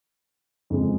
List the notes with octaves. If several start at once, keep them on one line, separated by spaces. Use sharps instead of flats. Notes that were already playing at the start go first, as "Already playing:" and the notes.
F2 C#3 G#3